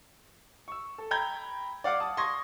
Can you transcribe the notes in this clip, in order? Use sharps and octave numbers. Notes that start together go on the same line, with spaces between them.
C#6 E6
A4
G5 A#5 B5 G6 G#6
D5 F5 F#5 D6
A5 D#6
C6 C#6 D#6 G#6 A#6